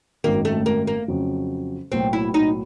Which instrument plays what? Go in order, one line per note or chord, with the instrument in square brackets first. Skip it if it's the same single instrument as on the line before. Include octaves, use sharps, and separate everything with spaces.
[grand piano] G#1 F#2 D#3 [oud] A#3
[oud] A3
A#3
A#3
[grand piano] F2 C#3 F#3
[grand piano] B1 A2 F#3 A#3 [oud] C4
[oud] E4
D#4